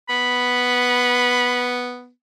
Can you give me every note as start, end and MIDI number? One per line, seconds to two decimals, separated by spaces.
0.09 2.10 59
0.09 1.75 83